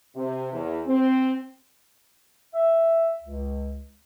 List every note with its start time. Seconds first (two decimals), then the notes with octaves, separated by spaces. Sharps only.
0.15 C3
0.52 E2
0.86 C4
2.54 E5
3.22 C#2